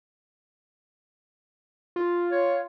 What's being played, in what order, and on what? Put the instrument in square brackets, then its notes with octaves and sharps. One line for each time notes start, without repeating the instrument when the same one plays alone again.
[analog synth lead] F4
[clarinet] C#5